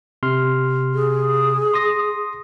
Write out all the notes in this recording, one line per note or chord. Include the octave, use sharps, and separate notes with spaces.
C3 C6 F6
G#4
C6 D#6 A#6